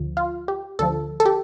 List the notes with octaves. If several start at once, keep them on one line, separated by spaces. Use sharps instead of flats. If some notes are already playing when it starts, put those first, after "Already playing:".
Already playing: D2 D3 F3
F4
G4
D2 D3 F3 A4
A4
G4